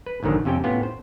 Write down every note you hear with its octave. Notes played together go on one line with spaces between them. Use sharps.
B4
A#1 G#2 D3 D#3 F#3
F2 C3 C#4 G4 A4 G5
A2 B3 C#4 F4 G4
C5